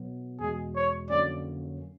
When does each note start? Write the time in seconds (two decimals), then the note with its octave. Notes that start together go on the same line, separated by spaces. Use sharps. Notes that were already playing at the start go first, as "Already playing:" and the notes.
Already playing: B2 F#3 B3
0.40 E2 B2 G#3 G#4
0.76 C#5
1.10 F2 D3 F#3 A#3 C#4 D5